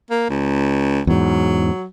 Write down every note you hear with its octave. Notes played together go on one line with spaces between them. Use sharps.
A#3
C#2
E2 G#2 F#3